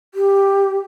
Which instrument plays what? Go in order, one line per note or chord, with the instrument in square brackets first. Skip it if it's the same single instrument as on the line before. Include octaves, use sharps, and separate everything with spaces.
[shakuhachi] G4